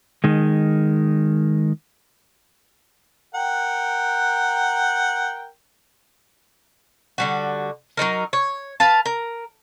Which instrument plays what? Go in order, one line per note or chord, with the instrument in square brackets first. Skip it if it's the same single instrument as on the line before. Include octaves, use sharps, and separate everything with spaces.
[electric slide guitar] D#3 G#3
[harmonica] A#4 F#5 G5
[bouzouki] D3 G3 F#4
F#3 C#4 D#4 A#4
C#5
B4 F5 A5
A#4